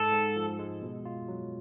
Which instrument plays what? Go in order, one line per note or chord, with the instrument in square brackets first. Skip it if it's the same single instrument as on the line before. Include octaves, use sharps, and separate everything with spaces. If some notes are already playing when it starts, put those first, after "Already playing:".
Already playing: [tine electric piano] G#2 [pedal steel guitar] A4
[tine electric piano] G#2
F3
G#3
B2
F4
F#3